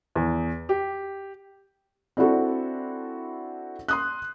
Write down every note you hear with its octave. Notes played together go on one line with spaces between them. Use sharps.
E2
G4
C4 D4 E4 F#4 A4
C6 D#6 F#6